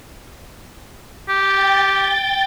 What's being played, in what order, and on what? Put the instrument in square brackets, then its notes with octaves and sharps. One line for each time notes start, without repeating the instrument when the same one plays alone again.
[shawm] G4 [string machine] G5 G6 A6